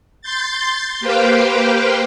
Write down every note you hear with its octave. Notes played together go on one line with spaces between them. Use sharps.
C6 G6 A6
A#3 G4 B4 C5 F5 G5